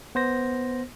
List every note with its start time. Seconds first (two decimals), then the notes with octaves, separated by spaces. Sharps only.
0.15 B3 C5 A#6